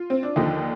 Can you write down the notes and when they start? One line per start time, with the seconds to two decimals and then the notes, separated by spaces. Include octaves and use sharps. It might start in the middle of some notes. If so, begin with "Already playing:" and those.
Already playing: F4
0.10 C4
0.23 D4
0.36 D#2 D3 F3 D#4